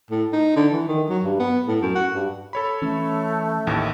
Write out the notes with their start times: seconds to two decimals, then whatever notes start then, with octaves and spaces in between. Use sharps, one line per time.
0.11 A2
0.33 D#4
0.56 D3
0.73 E3
0.88 D#3
1.09 F#3
1.24 G2
1.40 B3
1.68 A2
1.81 F#2
1.95 F#4
2.15 G2
2.53 A4 C#5 B5
2.82 E3 A3 C#4 E6
3.67 A1 D#2 A2